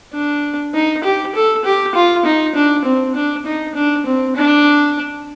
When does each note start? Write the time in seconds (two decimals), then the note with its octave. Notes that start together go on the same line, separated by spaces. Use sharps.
0.13 D4
0.75 D#4
1.04 G4
1.35 A4
1.65 G4
1.95 F4
2.25 D#4
2.55 D4
2.85 C4
3.15 D4
3.46 D#4
3.75 D4
4.06 C4
4.36 D4